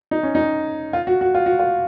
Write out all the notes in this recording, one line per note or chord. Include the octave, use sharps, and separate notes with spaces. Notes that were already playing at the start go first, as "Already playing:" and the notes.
D#4
C#4
D#4
F4
F#4
F#4
F4
F#4
F4